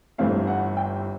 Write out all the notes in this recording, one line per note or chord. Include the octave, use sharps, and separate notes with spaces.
G1 G2 E3 A3 C4 F5
F#5
G5